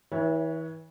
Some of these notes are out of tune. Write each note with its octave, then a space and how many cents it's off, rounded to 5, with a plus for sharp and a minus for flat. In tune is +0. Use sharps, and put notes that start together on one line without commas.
E3 -35 C#5 +10 E5 +0